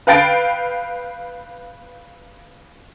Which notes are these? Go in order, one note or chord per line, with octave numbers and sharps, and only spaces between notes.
B4 F5 G5 A6 D7